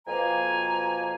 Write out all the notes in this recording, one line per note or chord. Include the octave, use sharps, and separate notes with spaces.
F2 B2 F3 A#3 G#5 A#5